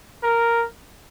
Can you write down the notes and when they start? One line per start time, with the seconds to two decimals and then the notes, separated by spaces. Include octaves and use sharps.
0.23 A#4